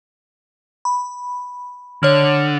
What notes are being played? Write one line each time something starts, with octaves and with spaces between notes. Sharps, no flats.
B5
D3 C#5 F6